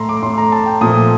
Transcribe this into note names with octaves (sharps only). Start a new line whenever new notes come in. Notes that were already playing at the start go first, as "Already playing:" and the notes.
Already playing: A2 A3 A#5 C6
D6
A2 A3 C6
A#5
A5
G5
A#2 F3 A3 D#6